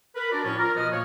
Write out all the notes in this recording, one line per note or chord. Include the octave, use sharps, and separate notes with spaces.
A#4 B4
D4 F#4 A#4 D5
A2 F3 C#4 D5 C#6
F4 A#4
B2 F3 B3 D#5 F6
A#2 A#3 C#5